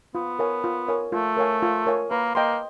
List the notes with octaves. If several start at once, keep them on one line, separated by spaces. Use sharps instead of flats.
B3 F4
A#4 C#5 F5 G#5
F4
A#4 C#5 F5 G#5
A3 F4
A#4 C#5 F5 G#5
F4
A#4 C#5 F5 G#5
A#3 B4
A#3 D#5 G5 C6